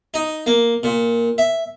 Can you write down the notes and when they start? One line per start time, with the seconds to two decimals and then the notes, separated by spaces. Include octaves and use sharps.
0.14 D#4
0.46 A#3
0.83 A#2
1.38 E5